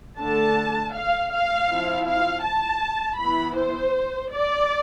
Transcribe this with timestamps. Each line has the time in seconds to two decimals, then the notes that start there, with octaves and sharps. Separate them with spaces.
0.19 D3 A3 D4 A5
0.94 F5
1.31 F5
1.69 F3 C4 E4
2.06 F5
2.44 A5
3.19 E3 B3 E4 B5
3.57 C5
4.32 D5